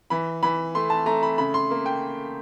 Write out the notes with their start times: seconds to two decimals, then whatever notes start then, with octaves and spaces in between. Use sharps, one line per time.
0.10 E3 B5
0.43 E3 B5
0.75 A3 C6
0.90 A5
1.06 A3 A#5
1.23 B5
1.38 C#3 B5
1.54 C6
1.71 A#3
1.86 G5